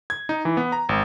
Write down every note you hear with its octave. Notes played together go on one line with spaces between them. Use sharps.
G#6
D#4
E3
B3
A#5
G#1